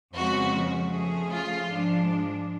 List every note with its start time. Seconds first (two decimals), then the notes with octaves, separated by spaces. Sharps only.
0.15 F2 C#3 F3 G#3 B3 F#4
0.93 F3 A3 C#4 G#4
1.32 F4
1.71 G#2 F3 G#3 D4